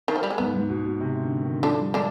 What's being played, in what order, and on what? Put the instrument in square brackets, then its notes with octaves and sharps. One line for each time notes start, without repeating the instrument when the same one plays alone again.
[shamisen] D#3
F3
G3
G#3
[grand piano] G#2 [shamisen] B3
[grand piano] G#2
B2
B2
C3
D3
D#3
[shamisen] D3 D4 [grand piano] F3
[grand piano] G3
[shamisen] D3 D4 [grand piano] G#3